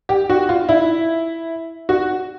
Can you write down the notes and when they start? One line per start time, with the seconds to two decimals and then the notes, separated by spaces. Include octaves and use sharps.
0.09 G4
0.30 F#4
0.49 F4
0.69 E4
1.89 F#4